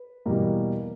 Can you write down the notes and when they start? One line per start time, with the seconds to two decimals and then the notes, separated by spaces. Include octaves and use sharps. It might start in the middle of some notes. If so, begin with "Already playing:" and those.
Already playing: B4
0.26 E2 B2 G3 A#3 A#4